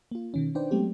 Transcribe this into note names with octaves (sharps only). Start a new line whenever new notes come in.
A#3 F4
B2 D#3 C#4
D4 D#4 B4 C5 D5 G5
F#3 G#3 A3 B3 C4 G4